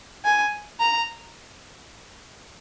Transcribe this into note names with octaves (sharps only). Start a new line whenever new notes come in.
G#5
A#5